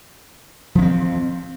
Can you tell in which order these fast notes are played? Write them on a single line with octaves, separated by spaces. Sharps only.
F3 C#4 C4